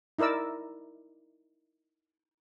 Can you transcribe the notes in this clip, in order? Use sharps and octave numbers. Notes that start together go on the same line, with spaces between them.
D#4 E4 A#4 D5 E6